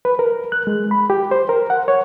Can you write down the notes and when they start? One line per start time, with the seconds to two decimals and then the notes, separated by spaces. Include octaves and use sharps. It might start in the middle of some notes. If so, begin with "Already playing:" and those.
0.05 B4
0.19 A#4
0.52 F#6
0.67 G#3
0.91 B5
1.10 G4
1.31 C5
1.49 A#4
1.70 F#5
1.88 C#5